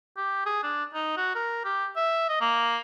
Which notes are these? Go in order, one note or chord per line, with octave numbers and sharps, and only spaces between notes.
G4
G#4
D4
D#4
F#4
A#4
G4
E5
D#5
A#3